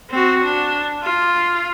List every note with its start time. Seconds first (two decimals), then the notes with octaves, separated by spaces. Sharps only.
0.10 C4 F#4
0.45 D4
1.03 F4